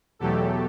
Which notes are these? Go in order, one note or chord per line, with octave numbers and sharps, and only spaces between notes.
E2 B2 F#3 A3 G4 A4